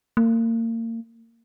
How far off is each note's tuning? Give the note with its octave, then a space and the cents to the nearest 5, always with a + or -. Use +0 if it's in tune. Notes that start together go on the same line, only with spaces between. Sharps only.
A#3 -35